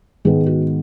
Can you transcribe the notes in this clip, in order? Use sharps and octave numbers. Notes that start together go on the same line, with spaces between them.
G#2 D#3 G#3 B3 G#4
F#4